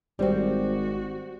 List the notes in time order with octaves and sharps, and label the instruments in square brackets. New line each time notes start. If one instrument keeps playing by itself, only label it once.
[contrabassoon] G#1 [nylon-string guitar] G3 C4 [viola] F#4 [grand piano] G4 C5 D5